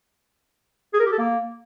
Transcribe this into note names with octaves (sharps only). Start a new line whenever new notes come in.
G#4
A#4
G4
A4
A#3